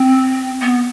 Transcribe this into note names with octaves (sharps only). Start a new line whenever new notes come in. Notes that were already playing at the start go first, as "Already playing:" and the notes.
Already playing: C4
B3